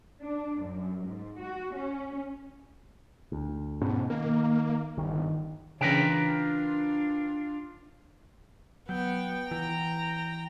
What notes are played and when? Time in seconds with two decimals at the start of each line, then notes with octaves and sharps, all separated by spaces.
0.22 D4
0.60 F#2
1.05 G#2
1.39 F#4
1.74 C#4
3.32 D2
3.82 G#2 B2 B3 C#4
4.10 D#3 A#3
4.98 G1 D#3
5.81 C#3 E3 D4 F4 A#4 B4 G5
8.89 F#3 B3 G5
9.51 E3 A#5